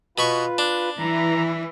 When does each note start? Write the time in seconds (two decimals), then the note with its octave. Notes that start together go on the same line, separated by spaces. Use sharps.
0.18 B2 F4 B4 B5 C#6
0.58 D4
0.99 E3 A#5